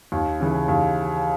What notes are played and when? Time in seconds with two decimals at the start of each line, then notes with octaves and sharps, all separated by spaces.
0.12 D#2
0.40 C#3 E3
0.68 D#2